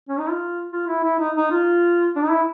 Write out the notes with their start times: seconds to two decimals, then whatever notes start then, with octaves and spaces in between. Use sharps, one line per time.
0.09 C#4
0.19 D#4
0.29 F4
0.72 F4
0.88 E4
1.03 E4
1.19 D#4
1.36 D#4
1.51 F4
2.16 D4
2.23 D#4
2.31 E4